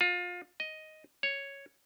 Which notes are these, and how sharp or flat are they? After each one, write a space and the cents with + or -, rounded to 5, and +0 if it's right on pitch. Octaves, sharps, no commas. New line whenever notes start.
F4 +25
D#5 +5
C#5 +0